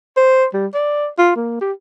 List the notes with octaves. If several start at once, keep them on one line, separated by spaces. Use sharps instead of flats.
C5
G3
D5
F4
A#3
G4